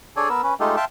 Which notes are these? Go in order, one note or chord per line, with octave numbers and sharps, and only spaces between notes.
D4 G#4 A4 C#5 D5 G#5
B3 A#4 E6
C#4 B4
G#3 A3 D#4 F4 G4 A4
E5 F5 G5 A5 C6